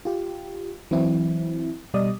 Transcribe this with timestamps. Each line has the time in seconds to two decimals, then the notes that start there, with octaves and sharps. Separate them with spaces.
0.05 F4 G4
0.91 E3 F#3 C4 E4
1.94 B2 G3 D5 D#5 D#6